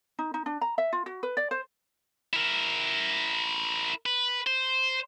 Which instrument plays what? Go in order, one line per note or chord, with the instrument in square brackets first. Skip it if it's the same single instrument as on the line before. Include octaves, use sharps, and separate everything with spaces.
[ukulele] D#4
D#4
D4
A#5
E5
F4
F#4
B4
D5
C5
[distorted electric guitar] E4 A#4
B4
C5